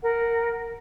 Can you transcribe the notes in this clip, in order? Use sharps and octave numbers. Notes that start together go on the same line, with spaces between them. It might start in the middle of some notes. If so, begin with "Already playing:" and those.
A#4 F#5